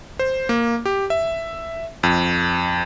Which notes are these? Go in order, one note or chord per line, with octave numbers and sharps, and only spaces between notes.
C5
A#3
G4
E5
F2